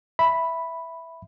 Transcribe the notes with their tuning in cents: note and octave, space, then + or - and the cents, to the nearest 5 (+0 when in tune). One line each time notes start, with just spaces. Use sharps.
E5 +0 B5 +0